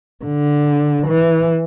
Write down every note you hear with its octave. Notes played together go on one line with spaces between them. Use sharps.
D3
E3